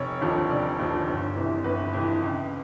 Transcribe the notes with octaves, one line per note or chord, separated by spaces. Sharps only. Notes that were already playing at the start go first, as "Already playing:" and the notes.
Already playing: F1 C#5
D#2 D3 F3
F1 D5
D#2 D3 F3
G1
F2 C3 E3
G1 B4
F2 C3 E3
C#2